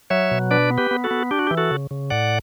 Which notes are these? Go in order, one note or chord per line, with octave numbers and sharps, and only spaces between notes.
F#3 C#5 E5
B2
D4 B4 D5
B3
G4 B4
B3
F#4 A4
B3
D4 G4
F#4
G4
E3
F#4 A4
C#3
C#3
A2 D5 F#5